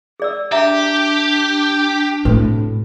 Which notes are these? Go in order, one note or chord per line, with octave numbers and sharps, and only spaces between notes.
G#4 D5 E6
D4 G4 E5 A#5
A2 C3 F#4 B4